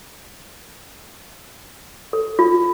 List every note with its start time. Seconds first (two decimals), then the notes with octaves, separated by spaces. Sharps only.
2.13 A4
2.39 F4